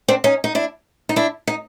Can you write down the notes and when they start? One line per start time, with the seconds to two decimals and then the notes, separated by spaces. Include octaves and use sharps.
0.08 C4 D4
0.24 C#4 D#4
0.44 D#4
0.55 D4 E4
1.09 D#4
1.16 D4 E4
1.47 D#4